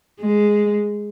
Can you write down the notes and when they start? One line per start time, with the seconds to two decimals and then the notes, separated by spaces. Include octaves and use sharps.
0.20 G#3